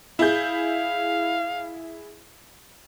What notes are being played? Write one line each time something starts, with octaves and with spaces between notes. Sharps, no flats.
E4 G#4 F5 G6